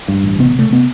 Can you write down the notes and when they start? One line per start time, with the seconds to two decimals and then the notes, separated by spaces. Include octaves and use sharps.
0.08 G2
0.24 A1
0.39 C3 B3
0.55 C3 A3
0.71 C3 B3